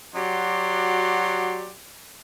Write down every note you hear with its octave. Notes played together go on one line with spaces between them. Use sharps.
F#3 F#4 G4 D5 C6